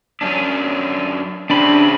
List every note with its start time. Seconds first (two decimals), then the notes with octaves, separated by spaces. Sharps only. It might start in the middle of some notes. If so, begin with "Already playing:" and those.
0.21 F#2 C#4 D4
1.50 C#3 C4 D4 D5 B5